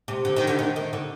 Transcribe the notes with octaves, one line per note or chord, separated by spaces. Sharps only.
C3
D3
D#3
D3
D#3
D#3
D3